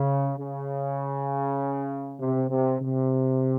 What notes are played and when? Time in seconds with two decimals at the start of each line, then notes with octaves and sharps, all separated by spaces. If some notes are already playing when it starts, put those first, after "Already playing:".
Already playing: C#3
0.39 C#3
2.20 C3
2.50 C3
2.81 C3